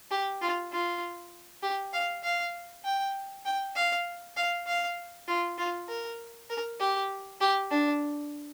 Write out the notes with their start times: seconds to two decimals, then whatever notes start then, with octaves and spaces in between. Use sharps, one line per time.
0.11 G4
0.41 F4
0.72 F4
1.63 G4
1.93 F5
2.24 F5
2.85 G5
3.45 G5
3.75 F5
4.37 F5
4.67 F5
5.28 F4
5.58 F4
5.89 A#4
6.50 A#4
6.80 G4
7.41 G4
7.71 D4